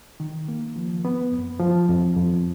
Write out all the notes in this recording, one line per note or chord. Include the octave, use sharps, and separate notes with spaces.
D#3
A#3
F3
B3
F#2
F3
F2
F2